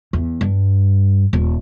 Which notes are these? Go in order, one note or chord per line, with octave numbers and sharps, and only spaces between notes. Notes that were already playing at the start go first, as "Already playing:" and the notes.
E2
G2
D#1